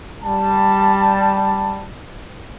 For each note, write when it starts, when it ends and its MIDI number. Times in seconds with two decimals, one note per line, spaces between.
0.22 1.85 55
0.22 1.85 81